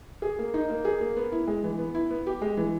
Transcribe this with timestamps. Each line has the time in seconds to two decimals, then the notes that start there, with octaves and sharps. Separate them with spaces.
0.22 G#4
0.39 A#3
0.54 D#4
0.70 A#3
0.85 G#4
1.01 A#3
1.17 B3
1.32 E4
1.47 G#3
1.64 E3
1.79 B3
1.95 E4
2.11 B3
2.27 G4
2.42 G#3
2.57 E3